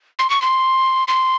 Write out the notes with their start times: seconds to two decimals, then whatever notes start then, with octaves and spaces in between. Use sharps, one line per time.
0.19 C6
0.30 C#6
0.42 C6
1.08 C6